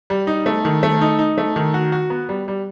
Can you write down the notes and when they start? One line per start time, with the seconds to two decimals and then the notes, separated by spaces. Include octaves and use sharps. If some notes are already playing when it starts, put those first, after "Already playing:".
0.10 G3
0.27 D#4
0.46 A3
0.65 D#3
0.83 A3
1.01 D#4
1.19 D#4
1.38 A3
1.56 D#3
1.74 F#4
1.92 F#4
2.10 B3
2.29 G3
2.48 G3